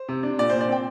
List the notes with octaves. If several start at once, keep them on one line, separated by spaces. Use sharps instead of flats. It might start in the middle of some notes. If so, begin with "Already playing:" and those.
Already playing: C5
C3
D4
A#2 D5
A#2 C5
D5
C4 G5